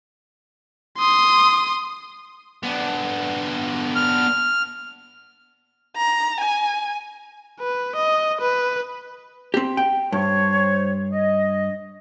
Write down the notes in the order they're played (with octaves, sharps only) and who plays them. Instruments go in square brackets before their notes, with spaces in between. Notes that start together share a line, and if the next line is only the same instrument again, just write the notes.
[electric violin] C6 D#6
[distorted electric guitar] B3 D4
[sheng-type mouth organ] F6
[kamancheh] A#5
G#5
[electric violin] B4
D#5
B4
[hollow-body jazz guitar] C4 G4
G5
[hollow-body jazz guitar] G2 [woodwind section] C5 C#5
[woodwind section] D#5